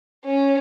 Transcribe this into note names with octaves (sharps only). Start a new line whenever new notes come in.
C#4